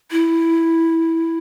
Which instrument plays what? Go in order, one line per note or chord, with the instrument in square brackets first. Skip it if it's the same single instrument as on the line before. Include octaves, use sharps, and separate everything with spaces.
[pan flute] E4